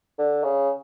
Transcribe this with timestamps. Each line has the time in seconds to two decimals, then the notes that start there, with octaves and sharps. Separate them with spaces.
0.19 D3
0.44 C#3